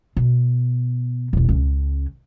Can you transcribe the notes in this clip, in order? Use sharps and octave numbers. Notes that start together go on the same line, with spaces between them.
B2
E1 B1
C#2 C#4